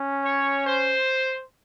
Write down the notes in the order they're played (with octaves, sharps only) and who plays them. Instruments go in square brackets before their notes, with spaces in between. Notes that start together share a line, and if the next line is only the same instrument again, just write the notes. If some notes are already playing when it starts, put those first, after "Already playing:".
Already playing: [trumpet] C#4
[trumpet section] C#5
C5